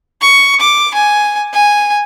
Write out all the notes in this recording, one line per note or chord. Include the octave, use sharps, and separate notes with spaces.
C#6
D6
G#5
G#5